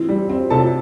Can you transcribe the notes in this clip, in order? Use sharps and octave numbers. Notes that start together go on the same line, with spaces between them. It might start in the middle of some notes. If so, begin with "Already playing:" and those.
Already playing: E3 C4
G3
C4
C3 A4 A5